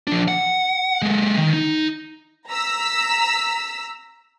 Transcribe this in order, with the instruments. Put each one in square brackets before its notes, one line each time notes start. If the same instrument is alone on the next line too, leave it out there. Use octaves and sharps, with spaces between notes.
[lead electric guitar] F3 D4
F#5
G#3 A#3
D#3
D#4
[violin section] A#5 E6 B6